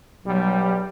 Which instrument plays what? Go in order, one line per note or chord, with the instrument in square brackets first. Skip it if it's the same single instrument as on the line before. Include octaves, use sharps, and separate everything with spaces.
[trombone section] B1 G3 [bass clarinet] F#3